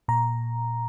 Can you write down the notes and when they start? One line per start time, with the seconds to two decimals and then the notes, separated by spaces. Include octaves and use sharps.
0.08 A#2 A#5